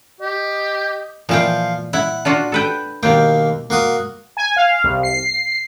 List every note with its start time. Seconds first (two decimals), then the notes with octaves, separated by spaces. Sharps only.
0.21 G4 D#5
1.29 A#2 E3 F3 F5 G5
1.93 E4 F#5
2.25 D4 F4 F#4
2.52 A4 B4 G5
3.03 D#2 B2 A#3 G5
3.70 A#3 F#4 D#6
4.37 G#5
4.56 F5
4.84 C2
5.03 C7